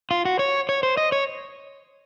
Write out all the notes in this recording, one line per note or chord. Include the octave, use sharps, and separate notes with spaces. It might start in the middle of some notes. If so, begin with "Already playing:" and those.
F4
F#4
C#5
C#5
C5
D#5
C#5